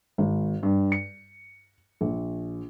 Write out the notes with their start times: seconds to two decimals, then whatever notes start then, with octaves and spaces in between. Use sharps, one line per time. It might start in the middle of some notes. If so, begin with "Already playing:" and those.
0.18 G#1
0.63 G2
0.92 C#7
2.01 A#1